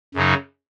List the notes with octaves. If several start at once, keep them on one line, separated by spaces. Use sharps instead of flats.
F#2 C#3 F#3 D#4